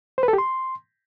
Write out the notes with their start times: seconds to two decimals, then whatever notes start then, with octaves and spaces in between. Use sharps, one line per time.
0.18 C5
0.23 B4
0.28 A4
0.33 G4
0.38 C6